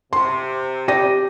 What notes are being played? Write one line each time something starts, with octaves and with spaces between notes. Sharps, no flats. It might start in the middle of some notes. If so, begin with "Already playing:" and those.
C3 C6
G4 D5 A#6 D#7